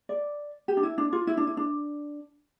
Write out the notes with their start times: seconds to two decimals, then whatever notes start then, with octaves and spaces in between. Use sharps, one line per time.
0.09 D5
0.68 G4
0.77 D4
0.83 E4
0.98 D4
1.13 F4
1.27 E4
1.37 D4
1.47 E4
1.57 D4